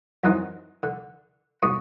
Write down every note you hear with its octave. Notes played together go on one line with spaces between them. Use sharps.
F#2 D#3 E3 C4 D#4
D3
G#2 B2 C#6 D#6